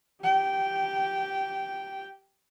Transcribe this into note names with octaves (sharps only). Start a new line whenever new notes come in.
G4 G5